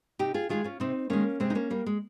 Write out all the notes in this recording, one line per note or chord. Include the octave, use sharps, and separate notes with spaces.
C3 D#4 G4
F4 G#4
D#3 G#3 F4 G#4
C#4 F4
C3 C4 D#4
D#3 G#3 A#3 C#4
C3 G#3 C4
D#4
A#3 C#4
G3 A#3
G#3